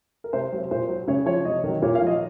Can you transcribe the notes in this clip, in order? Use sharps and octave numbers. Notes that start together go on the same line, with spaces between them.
A#4
C3 C5
F#3
C5
A#2 C5
F#3
C#3 C#5
F3 C#5
C3 D#5
D#3 F#3
A#2 C#5
F5
F3
D#5